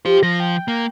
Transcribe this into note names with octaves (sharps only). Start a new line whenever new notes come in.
F4 G4 C5
F3 A#6
G5
A#3